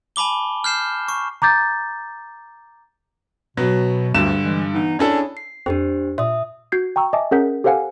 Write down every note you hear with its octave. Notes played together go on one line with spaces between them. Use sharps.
G#5 A5 B5 D6 G7
F6 G6 C7 E7
C#6
A#5 D6 G6 A6
B2 F#3 B3
D2 G2 D3 E7
E3 G#3
E3 B3 D#4
C#4 D4 E4 G#4 A4
C7
F2 D4 G4 C5
A#2 E5 D#6
F#4 G6 G#6 C7
G5 A#5 C#6 E6
D#5 E5 G#5 A5 D6
C#4 G#4 A#4 F#5 G6 B6
G4 A4 C5 F5 F#5 G#5